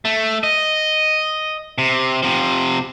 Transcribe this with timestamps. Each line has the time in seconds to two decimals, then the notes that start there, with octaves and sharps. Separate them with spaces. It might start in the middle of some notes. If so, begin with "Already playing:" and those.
0.05 A3
0.43 D#5
1.78 C3
2.23 C3 F3